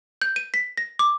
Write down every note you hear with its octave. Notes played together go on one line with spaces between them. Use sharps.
G6
D#7
B6
A#6
D6